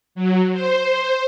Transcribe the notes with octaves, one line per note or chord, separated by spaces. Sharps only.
F#3
C5